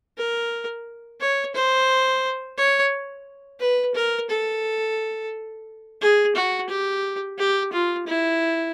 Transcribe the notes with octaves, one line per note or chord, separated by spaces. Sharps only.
A#4
C#5
C5
C#5
B4
A#4
A4
G#4
F#4
G4
G4
F4
E4